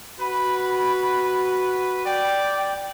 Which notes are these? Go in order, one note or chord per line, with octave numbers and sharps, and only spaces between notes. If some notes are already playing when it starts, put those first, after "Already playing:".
F#4 B4 B5
D5 G5